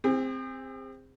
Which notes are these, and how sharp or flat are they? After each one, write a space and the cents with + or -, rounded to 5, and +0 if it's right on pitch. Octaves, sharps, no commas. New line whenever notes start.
C4 +0 G#4 -40